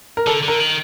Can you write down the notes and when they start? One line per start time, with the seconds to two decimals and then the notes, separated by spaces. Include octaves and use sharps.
0.17 A#4
0.27 D3 A4
0.43 D3
0.48 A#4
0.60 D#3